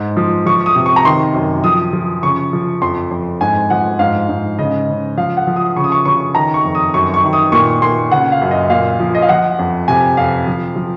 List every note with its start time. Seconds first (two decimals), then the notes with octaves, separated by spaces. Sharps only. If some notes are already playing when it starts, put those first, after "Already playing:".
Already playing: G#2
0.17 F3
0.46 F3 C#6
0.66 D#6
0.76 C3
0.86 C#6
0.96 A#5
1.05 D#3 C6
1.34 F#2
1.64 F3 D#6
1.93 F3
2.22 C#3 C#6
2.53 F3
2.82 F2 C6
3.11 F2
3.41 G#2 G#5
3.70 F3 F#5
3.99 G#2 F5
4.29 G#2
4.58 C#3 D#5
4.88 C#3
5.17 F3 F5
5.37 F#5
5.47 F3
5.56 D#6
5.76 C#3 C#6
5.84 D#6
5.92 C#6
6.05 C#3 C#6
6.35 D#3 A#5
6.54 C#6
6.65 F2
6.75 D#6
6.94 F#2 C#6
7.14 C#6
7.24 D#3
7.33 D#6
7.52 A#2 C#6
7.82 A#2 C6
8.11 C#3 F#5
8.32 F5
8.42 F#2
8.51 D#5
8.70 A#2 F5
9.00 F3
9.15 D#5
9.22 F5
9.29 F3 F#5
9.59 F2
9.88 C3 G#5
10.17 F2 F5
10.47 F3
10.76 F3